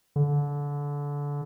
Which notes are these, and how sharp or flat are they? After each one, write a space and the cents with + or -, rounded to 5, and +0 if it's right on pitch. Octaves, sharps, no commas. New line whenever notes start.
D3 -25